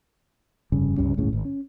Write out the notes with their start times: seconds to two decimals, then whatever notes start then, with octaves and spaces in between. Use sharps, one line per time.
0.72 F1 G2 C#3
0.97 C#2 G2 G3 C#4
1.17 G1 C#2 A2 C#3
1.33 G#1
1.45 C#4